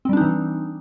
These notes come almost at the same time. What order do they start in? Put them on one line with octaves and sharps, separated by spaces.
C4 G3 D4 D#4 E3